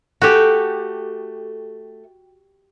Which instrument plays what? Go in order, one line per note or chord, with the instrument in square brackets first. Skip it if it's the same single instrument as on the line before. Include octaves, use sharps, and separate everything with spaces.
[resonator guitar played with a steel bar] A3 A4 G#5 [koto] F#4 G4